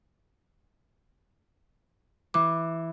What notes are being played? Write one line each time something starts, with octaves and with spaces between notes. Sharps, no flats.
E3 D6